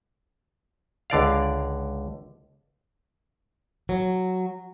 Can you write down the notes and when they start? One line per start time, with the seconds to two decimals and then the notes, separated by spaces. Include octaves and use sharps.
1.10 C#2 D3 D5 F5
3.89 F#3